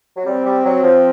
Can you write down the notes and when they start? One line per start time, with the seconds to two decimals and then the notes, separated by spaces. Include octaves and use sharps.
0.17 F#3
0.26 G3 C4
0.46 G3
0.65 F#3
0.84 F3